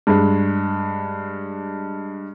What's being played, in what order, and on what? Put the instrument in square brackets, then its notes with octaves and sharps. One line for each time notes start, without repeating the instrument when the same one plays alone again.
[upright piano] G2 G#3